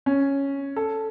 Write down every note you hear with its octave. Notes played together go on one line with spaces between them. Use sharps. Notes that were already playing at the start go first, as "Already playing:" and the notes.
C#4
A4